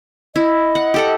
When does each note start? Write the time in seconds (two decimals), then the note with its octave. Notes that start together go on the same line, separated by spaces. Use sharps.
0.36 E4 D#5
0.75 F#5
0.94 G4 A4 F#5